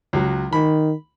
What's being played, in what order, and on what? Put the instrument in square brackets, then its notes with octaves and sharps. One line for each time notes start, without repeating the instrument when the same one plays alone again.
[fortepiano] C#2 F#3
[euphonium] D#3 [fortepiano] B5